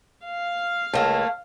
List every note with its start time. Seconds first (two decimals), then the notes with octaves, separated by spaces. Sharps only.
0.25 F5
0.94 C#2 A3 A#3 E4